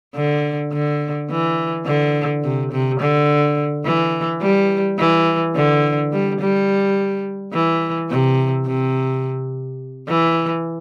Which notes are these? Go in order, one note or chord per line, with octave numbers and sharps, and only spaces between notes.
D3
D3
E3
D3
C3
C3
D3
E3
G3
E3
D3
G3
G3
E3
C3
C3
E3